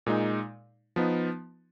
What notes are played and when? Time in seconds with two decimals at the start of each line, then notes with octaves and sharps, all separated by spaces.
0.06 A#2 G#3 D#4
0.96 F3 B3 D#4